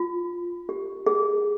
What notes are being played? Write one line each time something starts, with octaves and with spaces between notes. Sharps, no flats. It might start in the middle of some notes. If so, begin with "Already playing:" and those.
Already playing: F4
G4
G#4